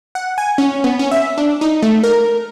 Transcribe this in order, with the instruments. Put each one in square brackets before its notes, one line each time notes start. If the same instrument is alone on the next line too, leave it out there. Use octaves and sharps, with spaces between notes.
[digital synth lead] F#5
G#5
C#4
B3
C#4
E5
D4
D#4
A3
A#4